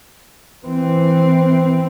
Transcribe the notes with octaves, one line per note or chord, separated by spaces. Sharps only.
E3 C4